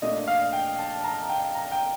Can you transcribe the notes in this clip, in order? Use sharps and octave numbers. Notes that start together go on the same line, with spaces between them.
A#2 A3 D4 D#5
F5
G5
A5
A#5
G5
A#5
G5